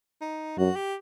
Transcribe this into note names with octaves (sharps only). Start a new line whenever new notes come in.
D#4
F#2 F#4
G4